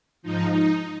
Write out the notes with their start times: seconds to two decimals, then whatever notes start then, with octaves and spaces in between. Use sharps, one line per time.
0.22 G#2 F3 D#4
0.52 D#4